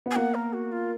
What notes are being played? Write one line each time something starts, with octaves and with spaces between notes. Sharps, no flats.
B3
G#5
A#3 F#5
A#4
F#4
F4